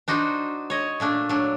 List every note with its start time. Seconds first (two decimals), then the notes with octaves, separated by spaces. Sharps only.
0.08 D4 D#4 F#4 C5
0.70 C#5 D#5
1.00 A#2 A3 D4
1.29 F#3 D4